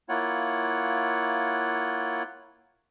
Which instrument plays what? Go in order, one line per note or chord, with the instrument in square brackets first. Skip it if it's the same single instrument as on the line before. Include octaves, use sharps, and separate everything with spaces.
[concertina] A#3 E4 F4 C#5 F#5